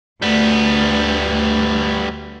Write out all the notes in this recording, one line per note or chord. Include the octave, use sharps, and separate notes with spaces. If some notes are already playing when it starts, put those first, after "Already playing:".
D2 G3 B3